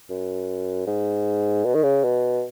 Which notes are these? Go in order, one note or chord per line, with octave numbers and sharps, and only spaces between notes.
F#2
G#2
B2
D#3
C#3
B2